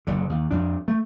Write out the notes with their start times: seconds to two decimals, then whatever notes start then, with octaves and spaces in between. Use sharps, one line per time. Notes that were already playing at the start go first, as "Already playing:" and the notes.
0.07 F#1 D3
0.29 D#2
0.51 F2 D4
0.88 A3